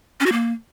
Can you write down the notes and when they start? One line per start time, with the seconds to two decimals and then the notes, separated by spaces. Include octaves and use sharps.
0.20 C#4
0.26 F#4
0.32 A#3